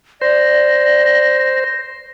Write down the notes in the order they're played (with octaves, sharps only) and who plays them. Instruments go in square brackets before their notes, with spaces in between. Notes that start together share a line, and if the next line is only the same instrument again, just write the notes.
[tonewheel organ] C5 [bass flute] D5 [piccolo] A#6